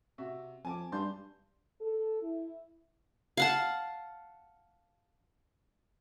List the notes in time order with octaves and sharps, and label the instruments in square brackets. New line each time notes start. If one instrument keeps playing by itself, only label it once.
[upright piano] C3 F#4 E5
[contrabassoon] F2 [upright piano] G#5 A5 D6
[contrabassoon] G2 [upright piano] A5 C6 G6
[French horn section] A4
E4
[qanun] F5 F#5 A5